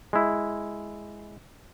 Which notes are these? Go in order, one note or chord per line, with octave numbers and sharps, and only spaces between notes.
G#3 E4